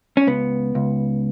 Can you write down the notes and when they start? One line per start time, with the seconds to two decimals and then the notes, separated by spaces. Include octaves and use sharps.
0.17 C#4
0.27 C#2 B3
0.75 C#2